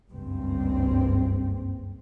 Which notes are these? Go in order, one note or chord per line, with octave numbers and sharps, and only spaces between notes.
F#1 C#2 G2 C4